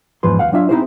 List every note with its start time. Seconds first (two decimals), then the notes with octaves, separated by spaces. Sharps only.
0.23 E2 G#2 F3 B4 C6
0.39 D2 F5 F#5
0.52 F#3 D4 F4 E5 F5
0.69 C4 D#4 E4 F#4 G#4 C5